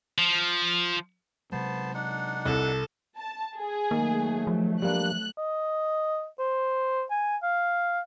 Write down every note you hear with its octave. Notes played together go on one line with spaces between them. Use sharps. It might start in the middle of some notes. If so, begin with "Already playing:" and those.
F3
C3 F#3 G#3 B3 C5 A5
D4 D#4 F#5
C2 A4
A5
G#4
D#3 F#3 A3 A#3
F3
G3 A#3 D4 F#6
D#5
C5
G#5
F5